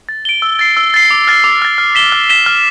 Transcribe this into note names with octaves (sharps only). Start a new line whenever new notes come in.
A6
D7 G7
E6
A6 C7
E6
A6 C7
D6
F6 A6
D6
F6 A6
F6
B6 E7 G7
F6
B6 E7 G7
F6